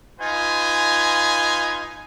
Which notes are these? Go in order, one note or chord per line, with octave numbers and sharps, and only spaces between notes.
D#4 F4 B4 G#5